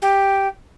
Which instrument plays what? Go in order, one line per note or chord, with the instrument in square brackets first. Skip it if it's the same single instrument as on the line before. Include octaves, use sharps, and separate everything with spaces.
[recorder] G4